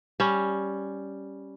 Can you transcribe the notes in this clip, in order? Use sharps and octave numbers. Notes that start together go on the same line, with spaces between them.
G3 C#4